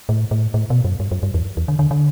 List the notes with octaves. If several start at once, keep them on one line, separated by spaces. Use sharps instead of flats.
A2
A2
A2
B2
F#2
G2
F#2
G2
E2
E2
D3
D3
D3